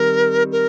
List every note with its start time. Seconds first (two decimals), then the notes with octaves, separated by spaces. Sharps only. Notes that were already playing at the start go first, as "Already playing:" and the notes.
Already playing: D#3 G3 C4 A#4
0.52 A#4